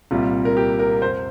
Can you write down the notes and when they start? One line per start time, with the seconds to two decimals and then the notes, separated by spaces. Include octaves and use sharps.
0.11 C2 A#2 G3 F4
0.45 A#4
0.57 G4
0.79 A#4
1.02 F2 C3 C5